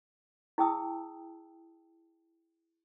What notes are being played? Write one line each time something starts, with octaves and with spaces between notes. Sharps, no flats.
E4 G#4 G5 A5 D#6 E6